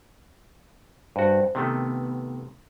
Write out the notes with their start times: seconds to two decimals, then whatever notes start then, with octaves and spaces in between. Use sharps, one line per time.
1.16 G2 F#4 C5
1.55 C3 D#3 A3 B3